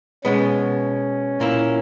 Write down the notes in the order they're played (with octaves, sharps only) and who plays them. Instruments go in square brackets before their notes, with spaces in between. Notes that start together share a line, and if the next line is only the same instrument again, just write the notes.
[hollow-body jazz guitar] B2 G#3 B3 [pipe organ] C#4
[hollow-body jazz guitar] A#2 A#3 E4